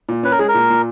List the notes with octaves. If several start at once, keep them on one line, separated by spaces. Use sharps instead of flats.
A#2
C#4 B4
A#4
G#3 G#4
A#4
A#2
A#2